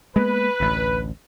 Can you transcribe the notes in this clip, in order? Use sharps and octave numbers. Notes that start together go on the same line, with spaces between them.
G#3 A#3 B3 B4
A1 D2